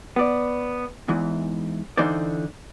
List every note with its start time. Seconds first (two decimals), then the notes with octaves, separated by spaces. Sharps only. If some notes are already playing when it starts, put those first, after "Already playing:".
0.16 B3 D5
1.08 E2 G#2 E3
1.97 D3 E3 D#4 C5 D5